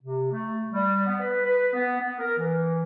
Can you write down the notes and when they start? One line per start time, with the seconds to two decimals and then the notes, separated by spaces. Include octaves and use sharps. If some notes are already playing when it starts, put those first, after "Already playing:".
0.03 C3
0.32 A3
0.72 G3
1.07 B3
1.20 B4
1.44 B4
1.73 B3
2.01 B3
2.19 A#4
2.38 E3